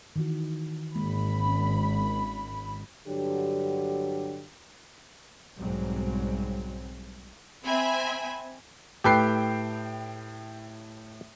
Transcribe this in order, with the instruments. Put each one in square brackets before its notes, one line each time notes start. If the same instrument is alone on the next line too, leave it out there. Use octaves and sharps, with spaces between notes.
[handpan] D#3 E3 F#4
[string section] G#1 B5 [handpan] D#3 G#3 A#3
[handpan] C#4
[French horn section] G2 D3 F#3 G4
[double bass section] B1 G#2 F#3 G3 C4
[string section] C4 E5 G#5 B5
[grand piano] A2 G5 C7 [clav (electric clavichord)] G4 A4 B4